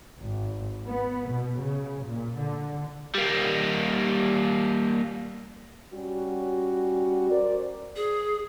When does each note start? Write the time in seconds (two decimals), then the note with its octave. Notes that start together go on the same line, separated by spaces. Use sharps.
0.19 G#1
0.86 B3
1.29 B2
1.59 C#3
2.06 A#2
2.38 D3
3.15 G3 A#3
5.94 G3 C#4 F#4
7.30 A#4 C5 D5
7.96 G#4